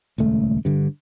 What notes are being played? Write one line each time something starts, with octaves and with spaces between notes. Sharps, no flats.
D#1 C#2 A3
G2 D3